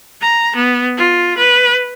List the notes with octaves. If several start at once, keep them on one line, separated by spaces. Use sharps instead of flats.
A#5
B3
F4
B4